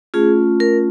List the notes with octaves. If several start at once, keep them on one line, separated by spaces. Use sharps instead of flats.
A3 C#4 F4 G#4
A#4